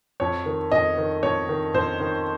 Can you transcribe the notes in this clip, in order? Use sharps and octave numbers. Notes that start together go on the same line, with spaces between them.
F2 C#5
D#3
F2 D#5
D#3
F2 C#5
D#3
F2 C5
D#3